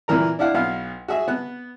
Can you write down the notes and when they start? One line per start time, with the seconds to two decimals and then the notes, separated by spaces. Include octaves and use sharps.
0.08 A#2 E3 A#4 A#5
0.39 D4 E4 F5 F#5
0.54 B1 B3 F5
1.08 F#4 G#4 E5
1.28 B3 F#6